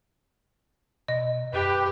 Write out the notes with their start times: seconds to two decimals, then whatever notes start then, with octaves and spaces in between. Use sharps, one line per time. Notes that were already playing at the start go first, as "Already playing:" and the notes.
1.08 B2 D#5
1.53 F#2 G4 B4 G5